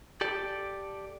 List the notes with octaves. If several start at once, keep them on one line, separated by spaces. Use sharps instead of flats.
G4 A4 D5